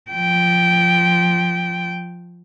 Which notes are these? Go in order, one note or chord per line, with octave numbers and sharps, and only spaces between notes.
F3 G5